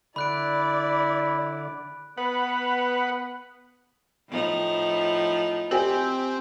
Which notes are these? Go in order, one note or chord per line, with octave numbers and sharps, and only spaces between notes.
D3 E4 D5 B5 F#6 D7
B3 B4 F#5
A2 F3 D#4
C4 G4 G#5 F#7